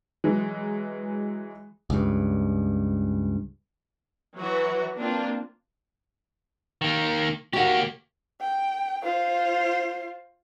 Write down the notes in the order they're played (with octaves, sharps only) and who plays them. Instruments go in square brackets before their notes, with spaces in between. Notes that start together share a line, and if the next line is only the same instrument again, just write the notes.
[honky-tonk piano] E3 F#3 G#3
[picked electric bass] C#2 G2
[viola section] E3 F#3 F#4
A#3 C4 D4 F4
[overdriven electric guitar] D#3 A#3
[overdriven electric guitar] A#3 G4 [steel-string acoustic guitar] F#4 F#5
[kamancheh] G5
F4 C5